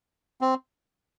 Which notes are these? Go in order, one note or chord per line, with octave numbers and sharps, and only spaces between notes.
C4